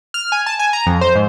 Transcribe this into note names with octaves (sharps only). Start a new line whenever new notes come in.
F6
G#5
A5
G#5
A#5
F2
C5
G#2